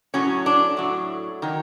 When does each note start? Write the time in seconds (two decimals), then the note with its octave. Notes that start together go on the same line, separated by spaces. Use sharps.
0.14 A2 F#3 C#4
0.46 D4
0.77 A2 F#3
1.42 D#3 F#3